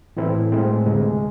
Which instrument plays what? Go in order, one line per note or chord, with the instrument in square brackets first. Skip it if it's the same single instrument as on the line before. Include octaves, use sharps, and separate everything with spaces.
[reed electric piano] A2 E3 A3 C4 E4
A2 G#3 C4
D2 C3 G#3